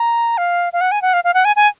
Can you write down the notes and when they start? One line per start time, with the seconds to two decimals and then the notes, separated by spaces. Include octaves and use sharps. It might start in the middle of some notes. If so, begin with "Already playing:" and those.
Already playing: A#5
0.38 F5
0.73 F5
0.81 F#5
0.91 G#5
1.02 F#5
1.13 F5
1.24 F5
1.34 F#5
1.45 G#5
1.56 G#5